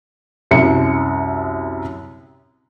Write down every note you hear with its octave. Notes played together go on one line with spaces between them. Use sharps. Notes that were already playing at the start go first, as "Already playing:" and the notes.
C2 F#2 C#7